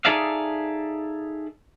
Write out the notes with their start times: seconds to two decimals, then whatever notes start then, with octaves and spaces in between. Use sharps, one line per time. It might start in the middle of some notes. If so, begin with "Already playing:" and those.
0.05 D#4 G#4 A4 D5 E5 F5